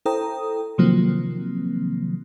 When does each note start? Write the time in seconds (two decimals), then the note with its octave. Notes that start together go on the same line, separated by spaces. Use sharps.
0.06 E4 A4 C5 G5 A#5 D#6
0.78 C3 D#3 F3 F#3 A#3 C4